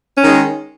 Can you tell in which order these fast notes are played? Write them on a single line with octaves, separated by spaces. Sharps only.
C#4 D#3 G#3